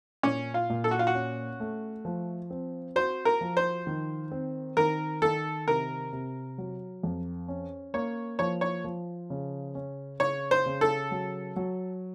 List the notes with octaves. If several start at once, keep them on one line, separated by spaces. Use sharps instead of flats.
A#2 C#4
F4
A#2
A4
F#4
F4
F#4
C#4
A3
F3
C4
F#4 C5
A#4
F3
C5
D#3
C4
D#3 A#4
D#3 A4
C3 A#4
C3
F#3
F2
C#4
A#3 C#5
F3 C#5
C#5
F3
C#3
C#4
C#3 C#5
C5
C#3
A4
F#3
F#3